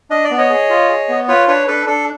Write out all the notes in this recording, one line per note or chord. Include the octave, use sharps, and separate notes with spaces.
D4 D#5
D5
B3
C#5 D#5
G#4
F4
G#4
B3
F4 B4 C#5
D4 B4 C#5
D4 A4 B4
D4 A4